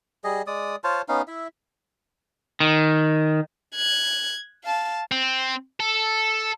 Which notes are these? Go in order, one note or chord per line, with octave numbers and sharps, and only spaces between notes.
G3 G#4 D#5
G#3 D5 D#6
F4 C5 C#5 A5
B3 C#4 D#4 F5
E4 E5
D#3
F#6 G#6
F5 A5
C4
A4